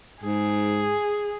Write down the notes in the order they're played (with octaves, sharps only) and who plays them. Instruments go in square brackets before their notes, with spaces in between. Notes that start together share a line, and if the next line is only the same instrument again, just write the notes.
[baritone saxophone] G#2 [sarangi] G#4